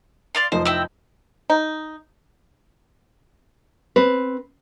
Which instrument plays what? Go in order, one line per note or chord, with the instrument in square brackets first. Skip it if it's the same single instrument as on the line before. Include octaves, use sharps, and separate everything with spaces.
[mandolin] D5 F5 C6
[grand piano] F1 F3 D#4 [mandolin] C5
[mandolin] C4 E4 G5
[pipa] D#4
[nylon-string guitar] C4 B4